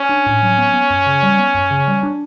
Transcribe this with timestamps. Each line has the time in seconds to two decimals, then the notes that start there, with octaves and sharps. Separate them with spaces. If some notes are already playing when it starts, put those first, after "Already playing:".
Already playing: C#4
0.09 D4
0.26 A2
0.42 F#3
0.58 B3
0.74 B3
0.90 F#2
1.06 C#3
1.23 G3
1.39 B3
1.54 F#2
1.71 C#3
1.87 G3
2.03 D4